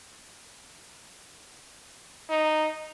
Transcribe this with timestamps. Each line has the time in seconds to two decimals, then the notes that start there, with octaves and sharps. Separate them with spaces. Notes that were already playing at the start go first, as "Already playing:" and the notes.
2.29 D#4